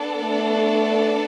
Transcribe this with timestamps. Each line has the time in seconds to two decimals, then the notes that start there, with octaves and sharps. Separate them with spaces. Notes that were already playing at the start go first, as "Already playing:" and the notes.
Already playing: B3 D4 A4 D5 A5
0.21 A3